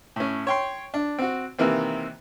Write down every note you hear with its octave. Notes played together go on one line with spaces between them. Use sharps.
A2 C#4
C#5 G5 C6
D4
C4 F#4
C3 D#3 E3 A#3 C4